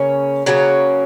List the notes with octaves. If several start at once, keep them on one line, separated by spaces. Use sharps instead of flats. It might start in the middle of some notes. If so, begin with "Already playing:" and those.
Already playing: C#3 A#3 C#4
C#3 F#3 A#3 C#4